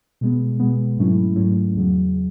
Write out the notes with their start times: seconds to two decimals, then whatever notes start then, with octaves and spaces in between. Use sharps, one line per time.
0.21 B2 G#3 B3
0.59 B2 G#3 B3
0.98 G#2 F#3 A3 C#4 E4
1.36 G#2 F#3 A3 C#4 E4
1.74 E2 C#3 F#3
2.14 C#3